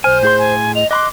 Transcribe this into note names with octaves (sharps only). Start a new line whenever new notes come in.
B1 C5 G#5 F6
A2 G#4 C6 G6
G#5
D#5 F7
D#5 B5 C6 D6 F#6